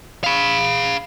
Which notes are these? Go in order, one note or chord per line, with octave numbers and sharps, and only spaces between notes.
F5 B5